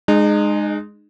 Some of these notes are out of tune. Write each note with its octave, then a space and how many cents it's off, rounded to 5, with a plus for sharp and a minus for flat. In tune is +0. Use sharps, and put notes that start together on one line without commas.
G#3 +0 D#4 -35